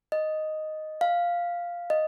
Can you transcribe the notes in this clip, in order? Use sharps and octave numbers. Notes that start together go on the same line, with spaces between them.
D#5
F5
D#5